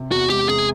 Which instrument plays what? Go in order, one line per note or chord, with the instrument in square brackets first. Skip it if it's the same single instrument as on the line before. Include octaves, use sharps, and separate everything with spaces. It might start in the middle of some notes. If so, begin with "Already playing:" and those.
Already playing: [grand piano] C3
[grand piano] E2 [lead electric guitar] F#4
[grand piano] G#3 [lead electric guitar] G4
[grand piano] C3 [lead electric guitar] G#4